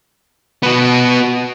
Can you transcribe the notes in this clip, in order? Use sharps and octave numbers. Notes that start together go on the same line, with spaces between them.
B3 F#4